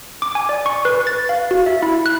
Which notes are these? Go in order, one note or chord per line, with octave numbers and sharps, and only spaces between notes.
D6
G#5
D5
C#6
B4
A6
F5
F#4
E5
E4
F#6